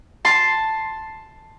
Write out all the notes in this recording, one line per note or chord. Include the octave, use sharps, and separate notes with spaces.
A5 C6